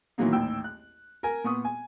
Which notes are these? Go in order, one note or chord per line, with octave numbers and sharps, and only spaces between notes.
A#2 D#3 E3 F#3 A#3 B3
A1 D#2 G5 E6
F#6
A#4 G#5
A#2 B3 C#6 D#6
G#5